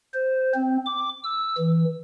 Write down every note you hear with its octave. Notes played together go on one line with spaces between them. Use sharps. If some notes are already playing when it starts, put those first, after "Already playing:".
C5
C4
D6
E6
E3